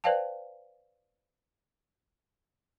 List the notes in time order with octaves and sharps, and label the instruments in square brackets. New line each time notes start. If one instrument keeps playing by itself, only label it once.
[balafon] B4 C5 D5 F5 G5 A5